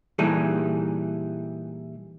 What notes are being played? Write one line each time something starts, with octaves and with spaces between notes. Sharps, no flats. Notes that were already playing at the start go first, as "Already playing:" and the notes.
A#2 E3 G3 D#4 G#4 A4